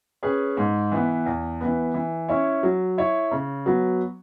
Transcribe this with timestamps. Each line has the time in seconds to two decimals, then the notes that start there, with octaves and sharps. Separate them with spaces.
0.23 C#4 G#4 B4
0.57 G#2
0.92 E3 B3
1.26 E2
1.61 E3 B3
1.94 E3
2.29 C#4 E4 C#5
2.63 F#3
2.98 E4 C#5
3.32 C#3
3.66 F#3 B3